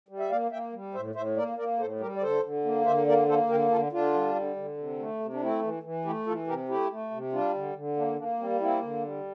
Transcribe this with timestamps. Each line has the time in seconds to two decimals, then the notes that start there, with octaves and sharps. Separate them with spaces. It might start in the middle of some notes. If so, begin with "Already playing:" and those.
0.09 G3
0.19 E5
0.30 A#3 D5 F5
0.51 A#3 E5 G5
0.73 G3
0.94 A2 C5 E5
1.15 A2 C5 E5
1.37 A#3 A#4 D5
1.58 A#3 A#4 D5
1.79 A2 A4 C5
2.00 G3 G4 A#4
2.16 D5
2.22 D3 A4 C5
2.43 D3
2.65 A#3
2.86 D3 C5 E5
3.07 A#3 A#4 D5
3.28 A#3 A4 C5
3.49 D3 G4 A#4
3.71 D3 F4 A4
3.92 D3 D4 F4
4.14 G3
4.35 D3
4.56 D3
4.77 C3
4.99 A3
5.20 C3
5.33 D4
5.41 A3 C4 E4
5.62 E3
5.83 E3
6.05 A3 E4 G4
6.26 E3 F4 A4
6.47 C3 G4 A#4
6.69 A3 E4 G4
6.91 A3
7.11 C3
7.32 G3 D4 F4
7.55 D3
7.75 D3
7.96 A#3 D4
8.18 A#3 D4
8.39 G3 C4
8.60 A#3 C4 E4
8.82 D3
9.03 G3